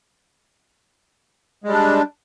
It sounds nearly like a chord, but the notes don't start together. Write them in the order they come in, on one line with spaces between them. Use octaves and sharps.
G#3 G3 D4